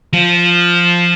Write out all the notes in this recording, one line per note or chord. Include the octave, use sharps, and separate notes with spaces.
F3